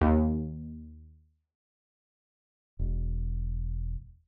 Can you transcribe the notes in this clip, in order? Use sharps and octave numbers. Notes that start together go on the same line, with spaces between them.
D#2
E1